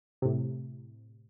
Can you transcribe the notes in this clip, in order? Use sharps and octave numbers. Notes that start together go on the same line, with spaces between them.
A2 C3